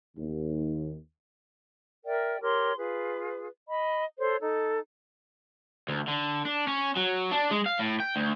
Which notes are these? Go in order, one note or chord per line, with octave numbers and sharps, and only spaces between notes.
D#2
A#4 D5 E5 G5
G4 A#4 C#5 C6
F4 G#4 B4
D#5 B5
A4 C5 C#5
D#4 A4
D2
D3
D4
C#4
F#3
D4
G#3
F5
A2
G5
D2